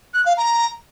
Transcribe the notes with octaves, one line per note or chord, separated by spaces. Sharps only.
F#6
F5
A#5